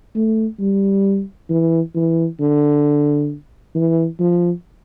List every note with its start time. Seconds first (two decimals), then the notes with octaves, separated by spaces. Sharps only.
0.15 A3
0.60 G3
1.49 E3
1.95 E3
2.40 D3
3.75 E3
4.20 F3